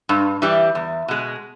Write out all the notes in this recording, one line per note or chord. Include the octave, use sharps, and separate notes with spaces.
G2
E3 G3
E2
B2 G#3